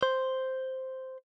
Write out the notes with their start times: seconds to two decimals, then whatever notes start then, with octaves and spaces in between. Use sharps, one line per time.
0.03 C5